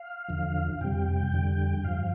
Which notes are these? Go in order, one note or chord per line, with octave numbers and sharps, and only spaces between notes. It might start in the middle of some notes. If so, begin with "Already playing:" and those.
Already playing: F5
E2 D3 F3
F2 C3 G3 G5
F2 D3 G3
G2 F3 F5